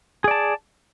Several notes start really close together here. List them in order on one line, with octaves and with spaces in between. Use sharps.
G#4 D5 A5